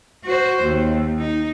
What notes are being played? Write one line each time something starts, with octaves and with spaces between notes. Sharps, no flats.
F#4 C5
D#2
D#4